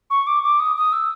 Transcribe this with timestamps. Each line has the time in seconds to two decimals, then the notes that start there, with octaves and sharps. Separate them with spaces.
0.10 C#6
0.27 D6
0.43 D6
0.60 D#6
0.76 D#6
0.92 E6